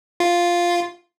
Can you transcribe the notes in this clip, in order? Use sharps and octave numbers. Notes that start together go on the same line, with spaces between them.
F4